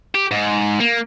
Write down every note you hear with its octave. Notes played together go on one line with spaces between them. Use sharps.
G4
G#2
A#3